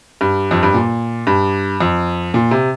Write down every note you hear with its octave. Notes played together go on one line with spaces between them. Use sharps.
G2
F2
G2
A#2
G2
F2
A#2
C3